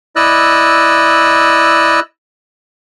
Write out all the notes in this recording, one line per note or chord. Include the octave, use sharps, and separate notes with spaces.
E4 D5 D#5 E6 F#6